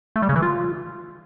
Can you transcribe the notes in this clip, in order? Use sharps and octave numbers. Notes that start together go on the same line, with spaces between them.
A3
G3
C#3
E3
F4